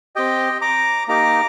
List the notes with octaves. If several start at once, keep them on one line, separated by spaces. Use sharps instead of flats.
C4 G4 D#5 G5
A#5 D6
A#3 D#4 G4 A#5 D6